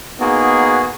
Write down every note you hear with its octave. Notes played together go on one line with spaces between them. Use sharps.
A#3 B3 D#4 F#4 G#4